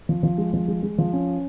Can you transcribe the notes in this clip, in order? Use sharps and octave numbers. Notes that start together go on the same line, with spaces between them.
F3
F3
G#3
F3
G#3
G#3
F3
C#4